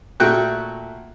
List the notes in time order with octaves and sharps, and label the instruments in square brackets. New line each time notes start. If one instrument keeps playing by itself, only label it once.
[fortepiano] A#2 A3 F#4 G5 F#6